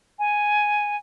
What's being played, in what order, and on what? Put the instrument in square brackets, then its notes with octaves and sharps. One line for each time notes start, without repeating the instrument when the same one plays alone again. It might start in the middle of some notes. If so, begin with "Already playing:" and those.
[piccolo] G#5